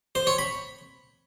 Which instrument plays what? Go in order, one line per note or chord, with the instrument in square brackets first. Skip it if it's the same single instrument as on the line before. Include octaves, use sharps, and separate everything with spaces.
[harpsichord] C5
C#5
B5